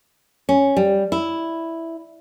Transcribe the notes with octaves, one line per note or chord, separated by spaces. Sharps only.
C#4
G3
E4